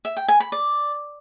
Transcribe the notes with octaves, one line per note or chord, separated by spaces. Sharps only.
E5
G5
G#5
B5
D5